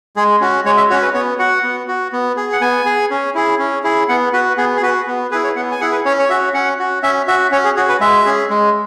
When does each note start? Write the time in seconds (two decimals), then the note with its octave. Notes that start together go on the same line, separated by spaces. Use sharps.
0.16 G#3 G#4
0.41 C#4 F#4
0.65 G#3 C#5
0.77 E5
0.90 C#4 F#4 C#5
1.02 B4
1.14 B3 C#5
1.39 F#4 F#5
1.63 B3
1.88 F#4
2.13 B3
2.37 G#4
2.53 F#5
2.61 B3 G#5
2.86 G#4
3.11 C#4
3.35 E4 G#4
3.59 C#4
3.84 E4 G#4
4.09 B3 F#5
4.33 F#4 B4
4.58 B3 G#4
4.77 G#4
4.82 F#4 B4
5.07 B3
5.31 E4 G#4 B4
5.44 C#5
5.55 B3 F#5
5.71 G#5
5.81 E4 G#4 F#5
5.92 B4
6.05 C#4 C#5
6.19 C#5
6.29 F#4 E5
6.54 C#4 F#5
6.79 F#4
7.02 C#4 E5
7.28 F#4 E5
7.52 C#4 C#5
7.65 G#4
7.76 F#4 G#4
7.89 B4
8.01 G#3 E5
8.25 C#4 G#4
8.50 G#3